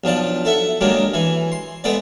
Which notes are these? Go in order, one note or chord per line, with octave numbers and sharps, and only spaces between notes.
B1 F3 D4 D5
A4 E5 F#5
D#3 F#3 G#3 A#3 D4
E3 G#5
C6
G#3 A3 B3 B4 D5